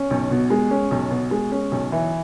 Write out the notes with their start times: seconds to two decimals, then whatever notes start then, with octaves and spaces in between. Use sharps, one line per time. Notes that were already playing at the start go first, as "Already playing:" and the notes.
Already playing: C#4
0.10 B1
0.30 B2
0.50 G#3
0.71 C#4
0.91 B1
1.11 B2
1.31 G#3
1.52 C#4
1.72 B1
1.92 E3